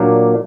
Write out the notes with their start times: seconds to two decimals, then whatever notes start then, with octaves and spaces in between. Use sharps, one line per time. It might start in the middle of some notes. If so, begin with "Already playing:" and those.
Already playing: A#2 F#3 A#3 D4